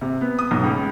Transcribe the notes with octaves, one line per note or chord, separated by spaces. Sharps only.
C3
B3
D#6
B1
C#2